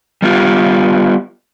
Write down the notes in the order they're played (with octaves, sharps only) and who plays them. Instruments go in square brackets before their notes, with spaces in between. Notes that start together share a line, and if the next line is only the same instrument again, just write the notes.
[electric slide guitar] G3 B3 F4 G4